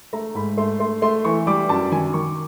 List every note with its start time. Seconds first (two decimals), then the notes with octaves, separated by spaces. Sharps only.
0.13 A3 A#5
0.35 G#2 B5
0.57 A3 C6
0.80 A3 C6
1.02 A3 C6
1.25 E3 C#6
1.47 G3 D6
1.69 F#2 A5
1.91 D#3 G#5
2.14 D#3 C#6